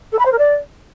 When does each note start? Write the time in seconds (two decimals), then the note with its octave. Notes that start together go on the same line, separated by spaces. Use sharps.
0.12 A4
0.18 B5
0.25 C5
0.32 A#4
0.38 D5